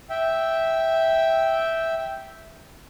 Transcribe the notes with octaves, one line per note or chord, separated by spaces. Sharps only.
E5 G5